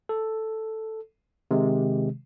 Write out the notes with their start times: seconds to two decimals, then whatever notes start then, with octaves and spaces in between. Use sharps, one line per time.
0.09 A4
1.51 C3 D#3 G#3